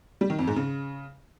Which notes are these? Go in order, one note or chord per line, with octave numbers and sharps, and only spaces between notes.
G3
D#3
F2
G#2
C#3